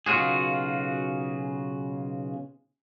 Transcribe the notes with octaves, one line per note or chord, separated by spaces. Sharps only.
B1 C#3 F4 F#4 G#4